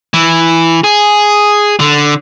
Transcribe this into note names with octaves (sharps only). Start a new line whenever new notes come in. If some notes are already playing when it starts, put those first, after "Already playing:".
E3
G#4
D3